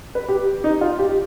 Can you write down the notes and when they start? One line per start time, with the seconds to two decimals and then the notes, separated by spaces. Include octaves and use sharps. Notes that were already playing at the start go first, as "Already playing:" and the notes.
0.15 B4
0.29 G4
0.64 D#4
0.81 F4
0.99 G4